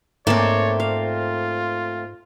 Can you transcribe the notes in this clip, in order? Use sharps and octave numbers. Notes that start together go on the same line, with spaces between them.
G#2 A3 A#3 C4 C#5 D5 A5
F4 F5